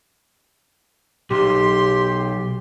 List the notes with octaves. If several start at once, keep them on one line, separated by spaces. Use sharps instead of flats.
B1 G4 C6